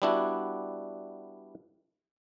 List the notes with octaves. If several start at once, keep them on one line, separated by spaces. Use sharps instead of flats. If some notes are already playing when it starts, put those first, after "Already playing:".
G3 B3 D4 E4 F#4